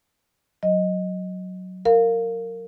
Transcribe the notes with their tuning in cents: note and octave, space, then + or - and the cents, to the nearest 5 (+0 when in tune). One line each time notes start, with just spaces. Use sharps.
F#3 +0 D#5 +0
A#4 -20 F5 +0